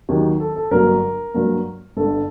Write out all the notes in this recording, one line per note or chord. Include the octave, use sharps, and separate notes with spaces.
D#2 D#3 F#3 G4
A4
A4
G1 G2 F#3 A#3 A#4
G2 F#3 A#3
G1 G2 D3 A4